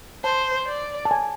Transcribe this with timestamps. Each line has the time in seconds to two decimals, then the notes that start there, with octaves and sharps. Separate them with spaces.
0.24 C5 A5
0.67 D5
1.05 A5
1.11 G#5